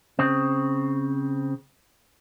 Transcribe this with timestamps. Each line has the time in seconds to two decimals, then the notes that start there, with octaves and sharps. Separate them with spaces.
0.19 C#3 C4